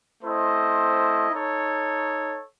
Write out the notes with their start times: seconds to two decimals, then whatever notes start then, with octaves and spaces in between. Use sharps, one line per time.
0.22 A3 C4 E4 C5 D#5
1.30 D#4 A4 C#5